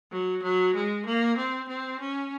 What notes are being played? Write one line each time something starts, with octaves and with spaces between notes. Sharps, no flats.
F#3
F#3
G#3
A#3
C4
C4
C#4